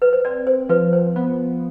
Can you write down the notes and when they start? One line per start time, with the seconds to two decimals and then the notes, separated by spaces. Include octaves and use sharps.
0.02 B4
0.13 C5
0.25 C4 D5
0.47 C5
0.69 F3 B4
0.93 C5
1.16 B3